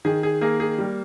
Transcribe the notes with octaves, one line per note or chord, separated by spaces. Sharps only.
D#3 G#4
G#4
A#3 G#4
G#4
G3